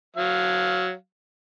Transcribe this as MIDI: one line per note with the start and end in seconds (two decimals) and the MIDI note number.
0.16 0.94 54
0.16 0.94 77